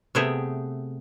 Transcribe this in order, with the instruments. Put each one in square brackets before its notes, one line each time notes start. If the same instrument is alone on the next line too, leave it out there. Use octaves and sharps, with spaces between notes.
[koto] C3 A3 B3 G#4 E5 G5